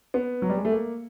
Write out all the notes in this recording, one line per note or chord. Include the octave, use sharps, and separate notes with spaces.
B3
F#3
G3
G#3
A3
A#3